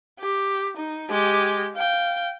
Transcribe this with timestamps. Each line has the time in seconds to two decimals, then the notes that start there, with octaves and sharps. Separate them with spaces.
0.19 G4
0.77 D#4
1.10 G#3 G4
1.75 F5 G5